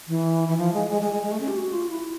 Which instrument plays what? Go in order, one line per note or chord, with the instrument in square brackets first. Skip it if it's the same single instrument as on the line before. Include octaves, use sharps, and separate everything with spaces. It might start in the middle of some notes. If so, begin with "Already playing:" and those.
[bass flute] E3
E3
F3
G#3
G#3
G#3
G#3
G#3
A3
C#4
G4
F#4
F4
E4